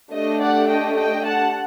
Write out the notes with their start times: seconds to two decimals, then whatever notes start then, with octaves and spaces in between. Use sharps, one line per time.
0.12 A3 D4 G4 D#5
0.40 D5 F#5
0.68 D#5 G5
0.97 D#5 G5
1.24 F#5 A5